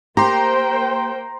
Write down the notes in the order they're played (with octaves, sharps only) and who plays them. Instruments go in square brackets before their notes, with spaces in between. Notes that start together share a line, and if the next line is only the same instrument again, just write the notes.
[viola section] A#3 C5 G5 [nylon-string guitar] G4 [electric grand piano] A#5 C6